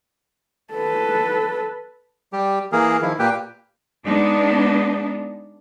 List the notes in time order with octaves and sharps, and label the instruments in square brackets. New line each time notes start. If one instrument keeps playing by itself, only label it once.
[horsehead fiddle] A4 B4
[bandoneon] G3 G4
E3 A#3 G#4 A#4
D#3 F3 E4
A#2 A#3 G4 B4 G5
[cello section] G#3 B3 D4 D#4